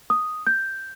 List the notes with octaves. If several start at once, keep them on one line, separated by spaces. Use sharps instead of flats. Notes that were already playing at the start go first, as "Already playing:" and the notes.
D#6
G6